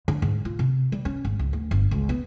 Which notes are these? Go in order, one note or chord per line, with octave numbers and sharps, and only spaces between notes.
D3
G#2
F4
C3
G3
C#4
G#1
C#2
D2
G1
C#2
B3